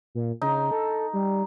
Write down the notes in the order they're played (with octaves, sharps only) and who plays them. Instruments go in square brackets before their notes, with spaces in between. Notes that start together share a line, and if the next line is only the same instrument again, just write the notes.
[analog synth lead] A#2
[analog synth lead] C#3 [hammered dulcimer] D#4
[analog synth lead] A4
G3